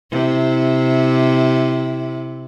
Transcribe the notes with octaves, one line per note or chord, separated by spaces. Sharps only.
C3 E4